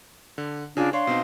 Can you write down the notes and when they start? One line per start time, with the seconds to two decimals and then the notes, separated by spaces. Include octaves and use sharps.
0.38 D3
0.77 C#3 D4 F4 G#5
0.93 D4 C#5 F5 C6
1.07 B2 C4 D#4